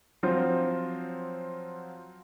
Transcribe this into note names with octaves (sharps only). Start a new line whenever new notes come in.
F3 F#3 C4 F4 C5